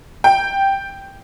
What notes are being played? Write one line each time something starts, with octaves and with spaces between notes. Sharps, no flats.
G5